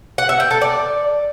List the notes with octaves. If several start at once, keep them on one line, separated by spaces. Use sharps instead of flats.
F#5
E5
G5
A4
D5